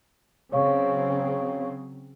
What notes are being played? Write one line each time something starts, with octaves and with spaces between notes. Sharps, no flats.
C#3 F#3 C4 C#5 F5 C#6